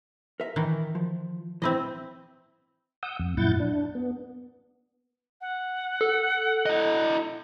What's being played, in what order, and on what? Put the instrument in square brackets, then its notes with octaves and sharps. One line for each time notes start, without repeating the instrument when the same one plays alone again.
[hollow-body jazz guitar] A#4 E5
[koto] D#3 E3
[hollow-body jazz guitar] F3
[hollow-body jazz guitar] E3 [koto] C4 E4 D#5
[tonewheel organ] F#5 D#6 E6 G6
F2
F#2 A#2 E4 F#5 G6 A6
D4
B3
[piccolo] F#5
[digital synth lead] A4
[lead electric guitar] E4 D#5